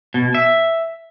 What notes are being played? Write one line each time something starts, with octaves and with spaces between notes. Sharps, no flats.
B2
E5